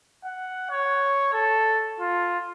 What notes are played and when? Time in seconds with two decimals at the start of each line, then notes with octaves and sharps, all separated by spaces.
0.25 F#5
0.70 C#5
1.33 A4
2.00 F4